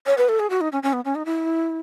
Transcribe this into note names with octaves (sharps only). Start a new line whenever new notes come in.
C#5
B4
A4
G#4
F#4
D#4
C#4
C#4
B3
C#4
D#4
E4